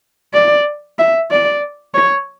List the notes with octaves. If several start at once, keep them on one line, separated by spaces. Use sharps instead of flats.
D5
E5
D5
C#5